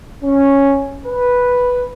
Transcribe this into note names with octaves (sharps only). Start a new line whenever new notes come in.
C#4
B4